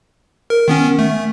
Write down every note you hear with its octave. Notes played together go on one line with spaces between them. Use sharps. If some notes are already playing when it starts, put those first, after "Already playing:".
A#4
D#3 B3 C#4
A3